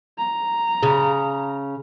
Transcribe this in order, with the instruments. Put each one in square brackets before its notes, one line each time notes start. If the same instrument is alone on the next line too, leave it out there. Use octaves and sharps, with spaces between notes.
[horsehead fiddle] A#5
[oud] C#3